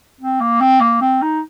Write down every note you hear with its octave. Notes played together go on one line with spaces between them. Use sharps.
C4
A#3
C4
A#3
C4
D#4